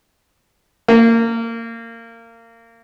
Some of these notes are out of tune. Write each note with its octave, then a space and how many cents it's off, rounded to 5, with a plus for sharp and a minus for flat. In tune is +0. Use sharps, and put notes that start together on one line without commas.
A#3 -25